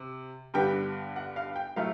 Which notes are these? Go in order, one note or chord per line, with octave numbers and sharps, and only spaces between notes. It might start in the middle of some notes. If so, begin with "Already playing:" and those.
Already playing: C3
G2 D3 G3 B3 G5
F#5
F5
G5
A2 F#3 A3 F5